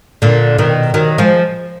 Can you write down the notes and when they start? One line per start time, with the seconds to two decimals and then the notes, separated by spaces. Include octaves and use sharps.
0.22 A#2 D3
0.58 B2 D#3
0.94 D#3 F#3
1.18 F3 G#3